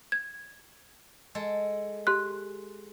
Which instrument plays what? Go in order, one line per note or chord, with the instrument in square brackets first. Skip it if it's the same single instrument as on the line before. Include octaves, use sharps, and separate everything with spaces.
[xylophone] G#6
[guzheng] G#3 A4
[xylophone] G4 C6 F#6